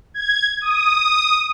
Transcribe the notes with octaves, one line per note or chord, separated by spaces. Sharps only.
G#6
D#6